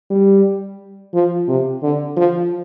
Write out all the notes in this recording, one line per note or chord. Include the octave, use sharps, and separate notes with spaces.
G3
F3
C3
D3
F3